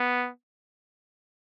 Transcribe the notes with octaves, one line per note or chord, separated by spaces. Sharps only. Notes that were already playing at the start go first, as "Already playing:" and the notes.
Already playing: B3